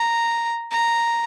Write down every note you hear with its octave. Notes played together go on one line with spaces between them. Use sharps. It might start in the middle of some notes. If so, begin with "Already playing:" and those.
Already playing: A#5
A#5